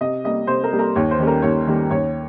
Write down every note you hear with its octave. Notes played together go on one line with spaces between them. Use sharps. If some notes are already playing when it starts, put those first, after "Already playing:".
C3 D#5
G3 A#3 D#5
C3 C5
A#4
G3 A#3
A#4
D#2 C#5
C5
D#3 G3 A#3 C#4
A#4
D#2 C#5
D#3 G3 A#3 C#4
D#2 C#5